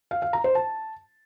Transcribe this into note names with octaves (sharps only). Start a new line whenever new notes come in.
F5
F5
A#5
C5
A5